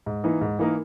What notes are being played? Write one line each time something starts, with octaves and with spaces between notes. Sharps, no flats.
G#2
E3 A#3 D#4 A#4
G#2
E3 A#3 D#4 A#4